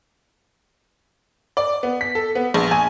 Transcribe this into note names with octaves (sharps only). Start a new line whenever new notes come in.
D5
B3
B6
A4
B3
A#1
G#5